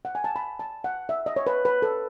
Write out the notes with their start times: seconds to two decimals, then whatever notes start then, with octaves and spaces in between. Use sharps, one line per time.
0.05 F#5
0.15 G#5
0.24 A5
0.36 B5
0.59 A5
0.84 F#5
1.09 E5
1.26 D#5
1.36 C#5
1.47 B4
1.65 B4
1.82 A4